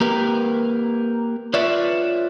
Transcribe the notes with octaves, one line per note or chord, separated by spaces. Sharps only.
A#3 G4 A#4 B4
F4 B4 C#5 D5 E5